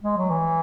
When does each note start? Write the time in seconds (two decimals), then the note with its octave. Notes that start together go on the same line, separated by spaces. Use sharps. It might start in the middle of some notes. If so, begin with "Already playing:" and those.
0.03 G#3
0.17 F#3
0.30 E3